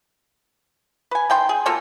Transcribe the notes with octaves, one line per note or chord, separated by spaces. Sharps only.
B4 G#5
D#3 G5 C6
G#4
B2 A#3 F4 A4